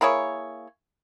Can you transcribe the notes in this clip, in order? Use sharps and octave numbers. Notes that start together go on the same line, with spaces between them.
A#3 E4 G#4 C#5